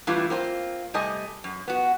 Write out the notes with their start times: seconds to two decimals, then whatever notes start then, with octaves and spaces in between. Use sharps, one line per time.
0.07 A2 E3 G3 D4 E4 F4
0.30 A#3 C4 F4
0.94 C3 G3 A3 D#5 G#5
1.44 F#2
1.68 B3 F#4